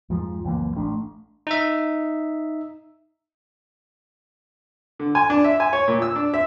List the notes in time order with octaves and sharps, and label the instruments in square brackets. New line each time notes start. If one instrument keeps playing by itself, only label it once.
[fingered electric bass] F2 G#2 F3
C#2 F#2 E3 A#3
A1 A3 D4
[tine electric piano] D#4 E5
[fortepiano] D3
G#5
D4
E5
G#5
C#5
A#2
E6
D4
E5